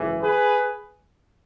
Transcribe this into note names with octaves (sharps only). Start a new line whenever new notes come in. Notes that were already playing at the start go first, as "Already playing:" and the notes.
Already playing: G#1 F#2 C#3 E3
G#4 B4